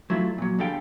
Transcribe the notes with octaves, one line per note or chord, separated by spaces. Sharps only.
F#3 A3 E4 F4
A#2 F#3
E2 D3 G3 A4 F5 G5